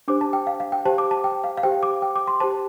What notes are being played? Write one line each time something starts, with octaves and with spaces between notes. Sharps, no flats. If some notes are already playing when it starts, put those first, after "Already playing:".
D4 G4 C5 D6
A5
G5
F5
F5
G5
G4 C5 A5
D6
A5
G5
F5
F5
G4 C5 G5
D6
G5
D6
C6
G4 C5 A5